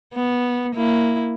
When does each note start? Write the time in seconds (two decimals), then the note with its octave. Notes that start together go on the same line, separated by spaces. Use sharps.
0.14 B3
0.75 A#3 E4